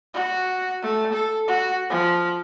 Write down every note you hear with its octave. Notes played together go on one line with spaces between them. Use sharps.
F#4
A3
A4
F#4
F3